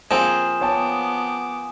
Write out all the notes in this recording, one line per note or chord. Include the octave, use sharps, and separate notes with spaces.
F3 A#3 C4 G#4 G#5 D#6 E7
B3 C#5 G5 A5 D6